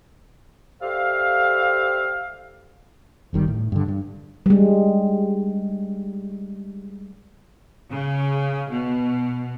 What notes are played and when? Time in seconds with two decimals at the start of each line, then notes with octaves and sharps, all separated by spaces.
0.82 G4 A4 C5 D5 E5 F5
3.33 D1 G1 D#3 G3
3.48 A2
3.72 G2 D3
3.88 G2
4.46 G3 G#3
7.91 C#3
8.69 B2